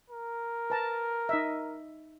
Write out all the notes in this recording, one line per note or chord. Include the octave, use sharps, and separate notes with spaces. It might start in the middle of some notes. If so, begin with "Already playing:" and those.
A#4
B4 A5 A#5
D#4 D#5 E5